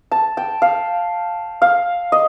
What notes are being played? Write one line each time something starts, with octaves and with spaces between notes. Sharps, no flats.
A5
G5
F5
F5
D#5